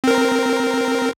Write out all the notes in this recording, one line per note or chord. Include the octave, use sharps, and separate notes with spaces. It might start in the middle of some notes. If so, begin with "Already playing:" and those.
C4 A#4